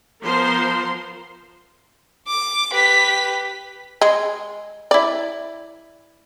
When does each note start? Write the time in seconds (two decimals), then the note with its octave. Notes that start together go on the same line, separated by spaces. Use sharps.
0.24 F3 B3 A#4 C5 C6
2.27 D6
2.72 G4 B4 B6
4.02 G#3
4.91 E4 D5